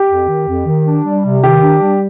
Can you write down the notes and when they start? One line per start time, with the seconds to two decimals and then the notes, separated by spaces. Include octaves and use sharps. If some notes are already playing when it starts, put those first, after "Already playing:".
Already playing: G4
0.08 F2
0.28 D#3
0.47 F2
0.66 D#3
0.86 D4
1.05 G3
1.24 C3
1.43 D#3 G4
1.62 D4
1.81 G3